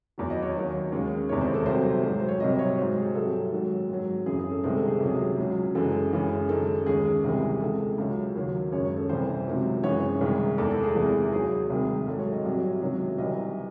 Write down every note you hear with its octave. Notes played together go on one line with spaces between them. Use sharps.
E2 D#3 F#3
D#5
C#5
D#2 D#3 F#3
D#2 C#3 G#3
E2 C3 D#3 G#3 C#5
C5
A4
C2 C3 F#3 C5
A4
C5
G#2 F#3 C5
C5
C#5
C2 C3 F#3 D#5
C#5
G#2 F#3 C5
G#4
C2 C3 F#3 A4
G#2 D#3 F#3
G#2 F#3
F#2 C#3 E3 G#4
G#4
A4
C2 C3 D#3 G#3 C5
A4
G#4
C#2 C3 F#3 G#4
C#2 C#3 F#3
F#2 E3 G#3 A4
F#2 C#3 E3 G#3
F#2 D#3 G#3 A4
D#2 C#3 G#3 G#4
C2 C3 E3 G#3
C#2 C3 E3 G#3 A4
C#2 C#3 F#3
D#2 D#3 F#3
F#2 C#3 G#3 C#5
C#5
A4
C2 C3 E3 C5
C#2 C3 D#3 F#3
F#2 E3 G#3 C#5
C2 C3 D#3 G#3
E2 D#3 G#3 A4
A4
G#4
E2 C3 E3 G#3
D#2 D#3 F#3 G#4
C2 C3 D#3 G#3
G#2 F#3 A4
C#5
D#5
C2 C3 F#3
C#2 C3 D#3 F#3
C2 C3 E3 D#5